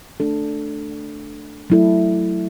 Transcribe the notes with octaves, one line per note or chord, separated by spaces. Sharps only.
A3 D4 A4
F#3 A3 E4 A4